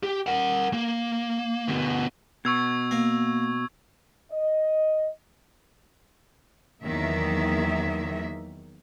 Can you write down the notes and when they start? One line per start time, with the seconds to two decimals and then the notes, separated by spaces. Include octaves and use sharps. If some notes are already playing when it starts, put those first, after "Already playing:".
0.03 G4
0.27 A#4 F#5
0.73 A#3
1.68 D2 B2
2.45 B2 C#6 E6 G#6
2.91 A#3
4.31 D#5
6.82 E2 D#3 F#3 A#3 E5